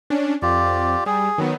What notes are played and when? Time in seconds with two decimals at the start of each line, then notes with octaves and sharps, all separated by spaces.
0.10 C#4 D4
0.42 F2 F4 G4 D5
1.06 G3 G#4
1.38 D#3 F#3 B3